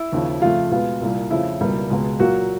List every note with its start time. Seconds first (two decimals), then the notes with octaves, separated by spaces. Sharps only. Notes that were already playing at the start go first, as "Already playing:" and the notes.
Already playing: E4
0.12 D#2 C#3 F3
0.42 F2 C#3 F3 A3 F4
0.71 B2 G#3 B3 F4
1.01 C2 A#2 G3
1.30 F2 C#3 F3 A3 E4
1.60 C#2 B2 G3 A#3
1.90 C#2 B2 G#3
2.19 A#2 F#3 A#3 F#4